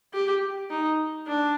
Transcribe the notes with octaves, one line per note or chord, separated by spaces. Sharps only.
G4
D#4
D4